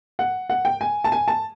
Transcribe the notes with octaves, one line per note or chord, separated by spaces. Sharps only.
F#5
F#5
G5
G#5
A5
G#5
A5